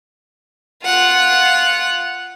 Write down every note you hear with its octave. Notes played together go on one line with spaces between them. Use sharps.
F4 F#5